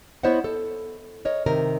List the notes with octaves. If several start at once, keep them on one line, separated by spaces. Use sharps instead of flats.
B3 E4 C5 C#5 D#5 F#5
A4
A#4 C#5 D#5
C3 D#3 A#4